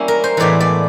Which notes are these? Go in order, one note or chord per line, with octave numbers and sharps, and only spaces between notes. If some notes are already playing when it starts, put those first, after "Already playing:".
Already playing: G3 A#3 C#4 E4
A#4
C5
A2 E3 G#3 B3 D5
D5